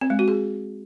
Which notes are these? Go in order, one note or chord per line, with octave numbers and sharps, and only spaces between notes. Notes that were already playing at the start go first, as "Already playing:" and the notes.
C4
G#3
F#4
G#4